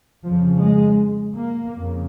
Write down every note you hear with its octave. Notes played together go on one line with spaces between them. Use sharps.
F2 C#3 F3
G#3
A#3
F2 C#3